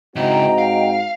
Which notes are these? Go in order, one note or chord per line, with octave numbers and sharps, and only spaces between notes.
G#2 C#3 C4 E4 F#4 D#5 G5 A#5
F5